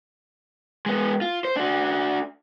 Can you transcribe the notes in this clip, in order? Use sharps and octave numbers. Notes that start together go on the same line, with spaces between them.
G#3 B3
F4
C5
D4 F#4